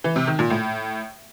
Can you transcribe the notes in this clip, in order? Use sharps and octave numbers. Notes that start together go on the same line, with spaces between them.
E3
C3
D#3
A#2
A2